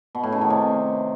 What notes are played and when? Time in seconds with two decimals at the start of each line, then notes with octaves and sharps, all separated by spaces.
0.15 B2
0.23 A2
0.32 C#3
0.41 D#3
0.50 C3